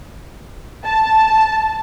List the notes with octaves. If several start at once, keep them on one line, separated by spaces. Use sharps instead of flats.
A5